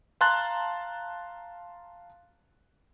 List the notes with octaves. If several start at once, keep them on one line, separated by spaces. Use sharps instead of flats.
F5 A5 A#5 C6 F#6 A6